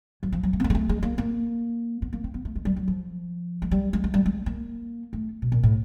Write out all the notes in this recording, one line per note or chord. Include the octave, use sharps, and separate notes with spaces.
F#3
F3
F#3
A3
B3
A#3
G#3
A3
G#3
A#3
A#3
B3
A#3
C4
B3
A3
G#3
G3
F#3
F3
G#3
G3
G#3
G#3
G3
G#3
A#3
A3
B2
A#2
A2